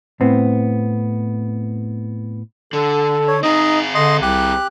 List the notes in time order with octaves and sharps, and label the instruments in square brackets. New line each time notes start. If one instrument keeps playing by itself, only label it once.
[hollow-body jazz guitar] A2 B3 C4
[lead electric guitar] D3 [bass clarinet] A4
[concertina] C#5
[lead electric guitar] C4 G#4 [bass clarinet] D#4 [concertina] D#5
[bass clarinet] D3 [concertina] D#5 C6
[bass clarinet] C2 [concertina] G4 F#6